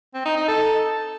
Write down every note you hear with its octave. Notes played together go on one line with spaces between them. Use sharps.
C4
D#4
D#4
A4